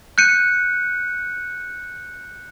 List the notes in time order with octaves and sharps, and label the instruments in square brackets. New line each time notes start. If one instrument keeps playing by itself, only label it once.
[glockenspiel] F#6 G6 C#7 D#7